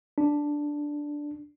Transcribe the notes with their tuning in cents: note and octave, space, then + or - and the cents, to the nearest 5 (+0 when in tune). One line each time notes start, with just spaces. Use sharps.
D4 +0